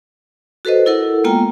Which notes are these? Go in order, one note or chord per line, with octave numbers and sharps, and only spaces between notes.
F#4 A4 B4 C5 D#5
E4 A4 A#4 F#5
G#3 A#3 B3 F4 G5 A#5